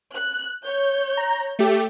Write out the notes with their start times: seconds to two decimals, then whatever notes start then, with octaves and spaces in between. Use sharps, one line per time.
0.13 F#6
0.63 C#5 G6
1.17 A#5
1.59 A3 G4